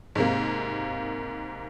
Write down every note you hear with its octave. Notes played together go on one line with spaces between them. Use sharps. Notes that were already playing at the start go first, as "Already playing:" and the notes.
G#2 C3 A#3